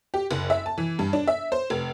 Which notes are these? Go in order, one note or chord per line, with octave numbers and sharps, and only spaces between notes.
G4
F#1
E5
A5
E3
G2
D4
E5
C5
F1